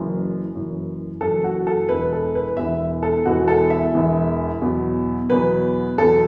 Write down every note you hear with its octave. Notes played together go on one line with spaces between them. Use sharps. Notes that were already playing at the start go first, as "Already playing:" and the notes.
Already playing: F#1 F#2 E3
F#1 F#2 E3
F#1 F#2 E3 A4
F#4
A4
E1 E2 E3 B4
A4
B4
E1 E2 E3 E5
A4
E1 E2 E3 F#4
A4
E5
E1 E2 E3
E2 B2 F#3
E2 B2 F#3 B4
E2 B2 F#3 A4